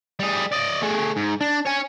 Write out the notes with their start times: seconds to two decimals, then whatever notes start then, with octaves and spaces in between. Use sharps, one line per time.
0.20 G3 G#4
0.52 D5 D#5
0.82 A3 G#4
1.17 G#2
1.41 D4
1.66 C#5 G#5